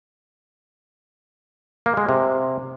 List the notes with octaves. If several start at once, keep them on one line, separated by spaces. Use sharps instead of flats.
A#3
G#3
C3